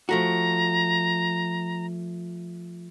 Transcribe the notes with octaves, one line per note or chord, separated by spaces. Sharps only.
F3 A3 F#4 A#5